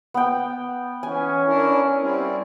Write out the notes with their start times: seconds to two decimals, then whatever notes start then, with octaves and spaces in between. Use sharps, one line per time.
0.14 B3 G5
1.03 E3 C#4 G#5
1.47 D4 E4 A#4
2.01 G3 C4 E4